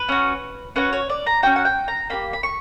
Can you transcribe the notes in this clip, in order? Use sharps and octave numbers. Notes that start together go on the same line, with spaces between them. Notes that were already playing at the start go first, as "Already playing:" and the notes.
Already playing: B4
C#4 F#4
C#4 F#4 B4
C#5
D5
A#5
C#4 F#4 G5
F#5
G5
A#5
A#3 D4 G4 B5
B5
C#6